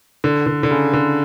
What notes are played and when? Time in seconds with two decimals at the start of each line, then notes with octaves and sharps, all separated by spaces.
0.24 D3
0.46 D3
0.63 D3
0.71 C#3
0.93 D3